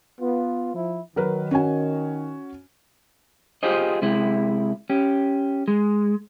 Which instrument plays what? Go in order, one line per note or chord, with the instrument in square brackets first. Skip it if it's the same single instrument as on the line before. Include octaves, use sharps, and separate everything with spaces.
[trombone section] B3 F4
F3 E4
[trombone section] D#3 [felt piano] F#3 A#4 B4
[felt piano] C#4 F#4 G#5
[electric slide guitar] F4 G4 G#4 C5 D#5
C3 G#3 E4
C#4 G4
G#3